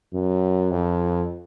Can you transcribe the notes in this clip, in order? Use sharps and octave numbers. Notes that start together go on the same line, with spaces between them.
F#2
F2